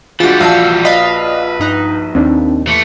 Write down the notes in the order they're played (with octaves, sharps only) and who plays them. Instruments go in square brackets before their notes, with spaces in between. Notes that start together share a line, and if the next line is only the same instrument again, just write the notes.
[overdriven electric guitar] E3 G3 [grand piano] G#3 D4 F#4 [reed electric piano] F4 [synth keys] A6
[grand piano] A#1 F#4 A5 [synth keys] F5 E6
[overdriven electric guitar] B4 [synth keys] D5 D#5 F5
[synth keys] G2 D#4 F#6
[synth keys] D#2 [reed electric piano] C4 D4 D#4
[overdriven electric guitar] E3 A3